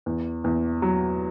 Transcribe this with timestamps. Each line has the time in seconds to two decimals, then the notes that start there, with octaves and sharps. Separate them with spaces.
0.06 E2
0.44 E2
0.82 F#3